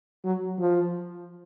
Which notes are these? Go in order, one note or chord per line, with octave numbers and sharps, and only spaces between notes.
F#3
F3